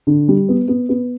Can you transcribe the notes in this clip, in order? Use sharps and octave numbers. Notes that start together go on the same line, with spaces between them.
D3
G3
B3
B3
B3